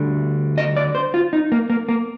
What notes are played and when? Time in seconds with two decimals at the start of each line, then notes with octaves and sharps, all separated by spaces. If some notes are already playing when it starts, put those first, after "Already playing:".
Already playing: D2 D3 G3
0.58 D#5
0.77 D5
0.95 C5
1.14 F4
1.33 D#4
1.52 A#3
1.70 A#3
1.89 A#3